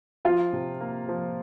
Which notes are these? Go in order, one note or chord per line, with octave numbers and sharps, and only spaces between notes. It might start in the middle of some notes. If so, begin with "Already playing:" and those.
F3 F4
C3
A#3
F3